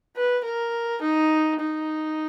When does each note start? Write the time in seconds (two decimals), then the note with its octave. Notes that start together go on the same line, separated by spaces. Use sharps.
0.16 B4
0.44 A#4
1.02 D#4
1.60 D#4